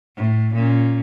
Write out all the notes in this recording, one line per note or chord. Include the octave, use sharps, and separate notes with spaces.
A2
A#2 C#4